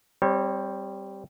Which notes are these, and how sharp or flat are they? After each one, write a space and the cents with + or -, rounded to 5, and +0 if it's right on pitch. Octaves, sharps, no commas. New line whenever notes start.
G3 +0 C4 +0 C#5 -30